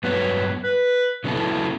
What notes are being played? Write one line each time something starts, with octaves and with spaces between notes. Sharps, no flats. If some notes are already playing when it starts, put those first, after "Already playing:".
G2 F#3 B3 F#4 B4 C#5
B4
C#3 F#3 B3 E4 A4